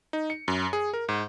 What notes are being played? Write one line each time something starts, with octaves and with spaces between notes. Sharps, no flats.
D#4
C#7
F#2
G#4
A#4
G#2